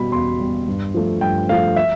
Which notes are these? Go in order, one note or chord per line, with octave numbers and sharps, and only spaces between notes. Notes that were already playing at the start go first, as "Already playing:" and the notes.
Already playing: B2 G3 B5
E2 C6
B2 G3
G2
F3 A3
G2 G5
F3 A3 F5
E5